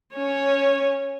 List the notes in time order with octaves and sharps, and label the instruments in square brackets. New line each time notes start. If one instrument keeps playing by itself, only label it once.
[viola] C#4 C#5